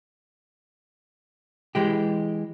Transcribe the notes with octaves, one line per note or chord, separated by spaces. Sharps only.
E3 G#3 G4